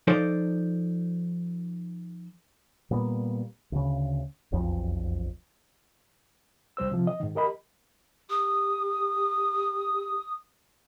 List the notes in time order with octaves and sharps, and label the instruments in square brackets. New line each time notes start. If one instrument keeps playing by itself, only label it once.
[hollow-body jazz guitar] F3 D#4 A4 C5 D5
[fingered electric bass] A#2 G3 A#3 B3
D2 C#3
E1 B1 F2 F3
[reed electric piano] C2 G3 C5 E6
C3 F3
D#5
G#2 D#3
G4 A#4 D#5 B5
[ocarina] G4 [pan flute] D#6